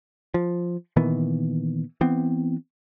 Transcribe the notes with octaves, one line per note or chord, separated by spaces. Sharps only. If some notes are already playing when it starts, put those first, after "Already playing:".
F3
A#2 D#3 E3 B3
E3 B3 C4